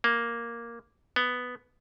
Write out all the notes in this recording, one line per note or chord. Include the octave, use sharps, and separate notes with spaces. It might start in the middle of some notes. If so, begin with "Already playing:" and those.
A#3
B3